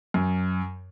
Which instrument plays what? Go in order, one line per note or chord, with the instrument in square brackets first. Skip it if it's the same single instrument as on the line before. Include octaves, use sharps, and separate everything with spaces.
[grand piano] F#2